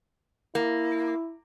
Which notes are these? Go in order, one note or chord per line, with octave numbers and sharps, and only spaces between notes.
A#3 E4